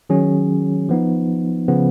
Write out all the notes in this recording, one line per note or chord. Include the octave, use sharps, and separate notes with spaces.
D#3 F#3 C#4 G#4
F3 B3 D#4
C#3 F3 B3